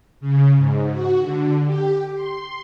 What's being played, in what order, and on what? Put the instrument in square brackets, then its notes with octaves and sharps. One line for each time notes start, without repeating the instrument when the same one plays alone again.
[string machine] C#3
G#2
F#4
D3
G4
C6